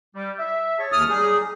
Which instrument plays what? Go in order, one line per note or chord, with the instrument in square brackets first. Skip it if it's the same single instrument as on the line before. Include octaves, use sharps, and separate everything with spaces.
[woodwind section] G3
E5
G#4 C#5 A5
[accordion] D#2 D#6 F6
[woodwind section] F#3 G3 D#4 [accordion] G#4